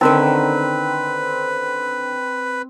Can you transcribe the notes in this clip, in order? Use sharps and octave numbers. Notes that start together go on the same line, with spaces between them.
D3 D#3 C4 C#4 D#4 A#4 B4